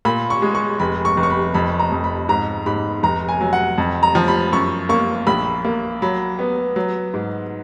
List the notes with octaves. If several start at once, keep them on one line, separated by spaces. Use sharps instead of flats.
A#2 B5
C#6
G#3
C#6
F1 B5
C#6
F1
C#6
B5
F2 B5
A#5
F2
B5
G#2 A#5
G#2 B5
F1 A#5
G#5
F#3
F#5
F2
A#5
F3
B5
F#2 C#6
A#3 C#6
A#1 B5
A#3
F#3 B5
B3
F#3
G#2